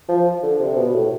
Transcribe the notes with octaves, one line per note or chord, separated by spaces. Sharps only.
F3
D3
C3
B2
A2